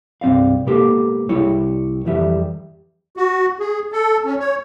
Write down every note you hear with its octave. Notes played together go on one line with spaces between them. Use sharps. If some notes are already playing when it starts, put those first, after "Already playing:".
C2 G2 C4 D5 F5
B2 G#3 A#3 G4 A4
C2 G3 E4 C#5
F2 E3 G3 E5
F#4
G#4
A4
C#4
C#5